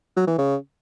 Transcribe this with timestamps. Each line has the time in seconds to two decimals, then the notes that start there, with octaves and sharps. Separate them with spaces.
0.16 F#3
0.27 E3
0.38 C#3